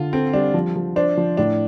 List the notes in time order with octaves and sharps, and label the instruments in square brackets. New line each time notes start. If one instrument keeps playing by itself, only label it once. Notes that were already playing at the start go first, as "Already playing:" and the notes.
Already playing: [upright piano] D3 [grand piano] F4
[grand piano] C4 [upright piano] A4
[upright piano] G3 [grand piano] D4
[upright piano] F3
F3
[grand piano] D4 [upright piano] C5
[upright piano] F3
[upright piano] A2 [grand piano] D4